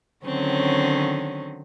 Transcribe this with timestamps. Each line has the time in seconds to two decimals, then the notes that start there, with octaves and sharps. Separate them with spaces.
0.25 D3 D#3 F#3 C4 C#4